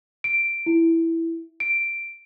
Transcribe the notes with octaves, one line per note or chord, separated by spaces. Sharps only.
D7
E4
D7